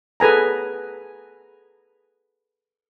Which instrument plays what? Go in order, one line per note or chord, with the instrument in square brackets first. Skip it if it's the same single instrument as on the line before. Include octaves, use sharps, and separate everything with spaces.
[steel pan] G#4 A4 B4 G#5 A#5